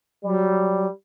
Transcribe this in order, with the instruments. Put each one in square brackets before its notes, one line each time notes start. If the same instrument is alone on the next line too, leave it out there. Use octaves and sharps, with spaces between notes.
[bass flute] F#3 [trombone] G3